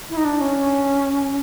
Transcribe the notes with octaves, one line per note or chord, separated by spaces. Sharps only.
E4
D#4
D4
C#4